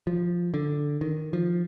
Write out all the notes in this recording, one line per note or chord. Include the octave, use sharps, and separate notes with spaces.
F3
D3
D#3
F3